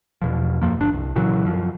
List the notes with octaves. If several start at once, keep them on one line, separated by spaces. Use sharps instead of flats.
E2 B2 F3
F#2 F3 A#3
G1 D4
C2
A#2 C#3 E3 F#3
F#2 F3